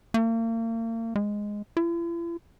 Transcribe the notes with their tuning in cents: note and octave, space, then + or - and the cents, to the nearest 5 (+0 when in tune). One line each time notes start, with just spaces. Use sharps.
A#3 -40
G#3 -5
E4 +45